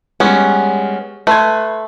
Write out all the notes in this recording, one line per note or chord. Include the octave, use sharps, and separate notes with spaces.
G3 G#3 B3 C#4
A3 B4 C6 G#6